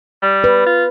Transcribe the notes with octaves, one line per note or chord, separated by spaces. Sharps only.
G3
B4
F4